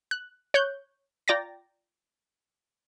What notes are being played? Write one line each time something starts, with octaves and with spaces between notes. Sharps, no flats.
F#6
C#5 F#6 G6
F4 D5 G5 A#5 A6 A#6